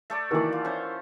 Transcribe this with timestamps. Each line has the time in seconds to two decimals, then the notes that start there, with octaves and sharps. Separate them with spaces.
0.10 A3 A4 D5
0.31 D#3 E3 A#3 F#4 D5
0.52 F4
0.65 C#4 C5